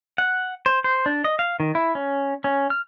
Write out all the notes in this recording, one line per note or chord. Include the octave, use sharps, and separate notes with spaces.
F#5
C5
C5
D4
D#5
F5
D#3
E4
C#4
C#4
F6